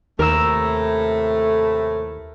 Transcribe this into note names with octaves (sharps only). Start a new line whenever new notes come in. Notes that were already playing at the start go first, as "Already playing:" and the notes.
D#2 A2 C3 A3 A#4 E6